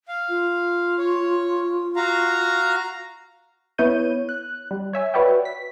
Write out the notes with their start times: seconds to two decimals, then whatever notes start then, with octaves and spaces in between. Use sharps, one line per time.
0.08 F5
0.29 F4
0.98 C#5
1.96 F#4 F5 A#5
3.78 B3 E4 B4 C#5 G6 D#7
4.29 F#6
4.71 G3
4.93 C#5 E5 G#5
5.14 F#4 B4 C#5 D5 E5 G5
5.45 B6